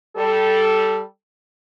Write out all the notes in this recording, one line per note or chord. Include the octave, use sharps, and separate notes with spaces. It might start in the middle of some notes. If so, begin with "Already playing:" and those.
G3 A4